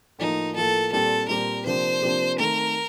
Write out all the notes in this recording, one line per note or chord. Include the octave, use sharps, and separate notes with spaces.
A2 F3 A#3 D#4
A2 F3 A#3 A4
A#2 G3 C4 G4 A4
A#2 G3 C4 G4 A#4
C3 F3 A#3 D4 G4 C5
C3 F3 A#3 D4 G4
D#3 A3 C4 A#4